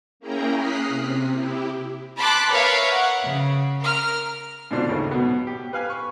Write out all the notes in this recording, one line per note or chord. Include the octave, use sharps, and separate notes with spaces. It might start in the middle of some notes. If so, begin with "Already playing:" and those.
A#3 C#4 E4 G#4 G5 A#5
D#6 F6 F#6 B6 C7
C3
E4 G4
A5 B5 C6 D6 F#6
A#4 B4 C#5 E5 F5
F#5
C#3
A#4 F6
G#2 B2 D3 D4 F4 C5
D#2 C#3 A3
B2 F#3 B3
G4
B4 F5 G#5
B5 C#6